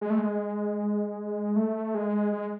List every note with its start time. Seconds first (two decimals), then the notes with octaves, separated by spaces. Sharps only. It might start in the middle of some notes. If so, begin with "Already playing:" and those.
0.01 G#3
0.10 A3
0.18 G#3
1.56 A3
1.95 G#3
2.33 G#3